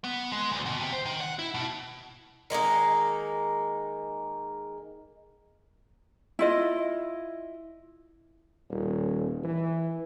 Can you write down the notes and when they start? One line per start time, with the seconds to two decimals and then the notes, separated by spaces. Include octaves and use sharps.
0.04 B3
0.32 G#3
0.52 D2
0.66 B2
0.80 C3
0.93 C5
1.05 D#3
1.21 F#5
1.39 E4
1.54 B2
2.50 D#3 G#3 A#3 D#4
6.39 E4 F4 D#5
8.70 D#1
9.44 E3